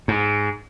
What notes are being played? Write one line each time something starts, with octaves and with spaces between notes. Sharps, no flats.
G#2